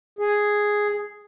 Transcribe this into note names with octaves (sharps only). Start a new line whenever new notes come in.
G#4